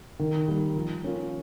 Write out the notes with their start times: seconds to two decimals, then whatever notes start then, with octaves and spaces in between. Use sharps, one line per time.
0.19 D#3
0.48 G3 A#3
0.75 F3
1.02 A#3 C#4 F4